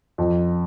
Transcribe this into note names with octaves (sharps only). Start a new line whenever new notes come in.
F2